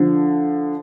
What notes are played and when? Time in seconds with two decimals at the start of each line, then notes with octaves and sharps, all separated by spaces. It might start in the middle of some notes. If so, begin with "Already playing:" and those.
Already playing: D3 F3